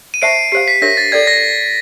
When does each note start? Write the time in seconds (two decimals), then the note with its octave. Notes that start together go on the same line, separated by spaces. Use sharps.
0.14 D#7
0.22 C5 E5 A5 C#6 C7 D7
0.52 G4 C5 F5 C7
0.68 B6
0.82 D4 G4 A#4 C#5 E5 A#6
0.97 A6
1.12 A4 D5 G5 G#6
1.27 A#6